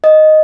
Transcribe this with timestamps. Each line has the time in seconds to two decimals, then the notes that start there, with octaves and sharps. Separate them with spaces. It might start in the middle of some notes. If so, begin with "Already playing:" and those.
0.04 D#5